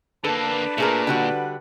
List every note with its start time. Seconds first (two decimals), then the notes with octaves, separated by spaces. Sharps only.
0.24 D3 A#3 D4 A4 B4
0.78 A#2 A3 G#4 A#4
1.07 D3 G3 F#4